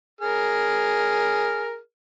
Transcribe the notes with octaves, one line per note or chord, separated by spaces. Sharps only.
G#4 A#4 F6